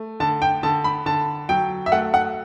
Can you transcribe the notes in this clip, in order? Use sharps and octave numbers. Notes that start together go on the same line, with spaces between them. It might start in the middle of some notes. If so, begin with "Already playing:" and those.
Already playing: A3
D3 A5
G5
D3 A5
B5
D3 A5
F#3 G5
E5
A3 F#5
F#5